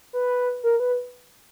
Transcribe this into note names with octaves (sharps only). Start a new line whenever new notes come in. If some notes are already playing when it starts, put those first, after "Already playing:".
B4
A#4
B4